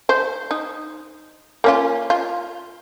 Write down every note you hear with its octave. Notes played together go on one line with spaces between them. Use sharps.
C5
D#4
A#3 C#4 F4
F4